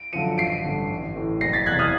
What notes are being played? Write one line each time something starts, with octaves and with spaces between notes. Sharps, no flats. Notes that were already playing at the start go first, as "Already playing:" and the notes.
Already playing: D7
F#2 D3 F3 C#7 D#7
A1 C7 D7
G2 D3
A1
A2 E3
F#1 A#6 C7
A6 B6
E2 C3 E3 F#6 G#6
D#6 F6